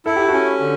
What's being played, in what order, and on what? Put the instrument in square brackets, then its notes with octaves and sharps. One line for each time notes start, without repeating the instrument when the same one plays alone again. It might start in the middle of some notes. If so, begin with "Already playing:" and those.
[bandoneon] E4 [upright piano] A4
[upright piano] G4
[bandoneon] C#4 [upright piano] F#4 A4
[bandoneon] D3